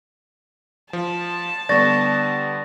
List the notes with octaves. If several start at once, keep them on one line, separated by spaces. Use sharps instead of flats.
F3 A5
D3 G3 B3 D5 C#6 A6 A#6